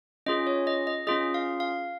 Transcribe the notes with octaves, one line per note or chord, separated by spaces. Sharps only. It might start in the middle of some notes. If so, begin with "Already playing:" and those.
C#4 F4 G#4 D#5
C#5
D#5
D#5
C#4 F4 G#4 D#5
F5
F5